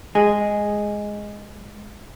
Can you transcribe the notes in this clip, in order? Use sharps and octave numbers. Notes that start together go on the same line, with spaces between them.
G#3 G#4